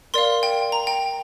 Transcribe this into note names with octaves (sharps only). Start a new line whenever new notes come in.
A#4 D5 F5 C6
G5
A#5
G5